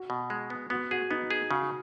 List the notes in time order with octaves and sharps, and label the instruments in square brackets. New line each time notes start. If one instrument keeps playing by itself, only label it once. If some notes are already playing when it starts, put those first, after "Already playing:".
Already playing: [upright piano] F#4
[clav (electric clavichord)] B2
G#3
B3
[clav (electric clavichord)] B3 [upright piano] F#4
[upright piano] F#4 [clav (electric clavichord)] G#4
[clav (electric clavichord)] B3 [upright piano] D#4
[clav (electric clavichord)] G#4
[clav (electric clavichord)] C#3 [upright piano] F#4